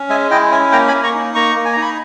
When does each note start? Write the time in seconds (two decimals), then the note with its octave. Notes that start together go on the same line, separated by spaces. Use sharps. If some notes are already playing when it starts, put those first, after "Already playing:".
Already playing: C#4
0.09 G#3 E5 G#5
0.30 E4 D#5 G5
0.51 C#4 E5 G#5
0.72 A#3 G5 A#5
0.88 G#5 B5
0.93 A#3
1.03 A#5 C#6
1.14 D#4
1.35 A#3 A#5 C#6
1.56 A#3
1.65 G#5
1.73 A#5
1.77 D#4 B5